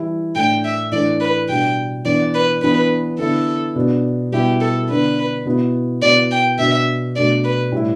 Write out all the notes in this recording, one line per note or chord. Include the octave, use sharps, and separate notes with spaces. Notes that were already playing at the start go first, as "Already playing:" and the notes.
Already playing: E3 G3 E4
A2 A3 D4 G5
E5
A2 E3 A3 D4 D5
B4
B2 G3 D4 G5
E3 B3 D4 D5
B4
E3 B3 D4 B4
D3 B3 E4 A4
B2 B3 D4
B2 G3 B3 E4 G4
A4
D3 B3 D4 B4
B2 B3 E4
B2 B3 E4 D5
G5
B2 B3 D4 E5
B2 A3 D4 D5
B4
A2 G3 E4